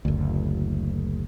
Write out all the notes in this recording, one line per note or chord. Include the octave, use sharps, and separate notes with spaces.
F#1 D2